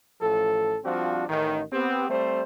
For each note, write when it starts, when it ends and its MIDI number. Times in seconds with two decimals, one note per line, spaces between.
0.20 0.77 33
0.20 0.77 45
0.20 0.77 53
0.20 0.77 69
0.84 1.26 53
0.84 1.26 55
0.84 1.26 60
0.84 1.26 62
0.84 1.26 65
0.84 1.26 66
1.28 1.62 33
1.28 1.62 51
1.73 2.05 59
1.73 2.05 60
1.73 2.05 67
2.10 2.43 55
2.10 2.43 57
2.10 2.43 60
2.10 2.43 72